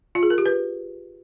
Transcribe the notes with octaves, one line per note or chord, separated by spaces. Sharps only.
F4
G#4
A#4
G4
B4